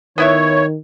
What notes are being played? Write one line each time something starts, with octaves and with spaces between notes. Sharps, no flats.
D#3 B3 E4 C#5 E5